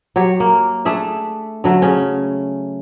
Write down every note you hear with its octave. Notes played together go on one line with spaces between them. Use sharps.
F#3 G4 C#5
A#3
A3 D4 G#4 E5
D3 F#3 A3
C#3 C#4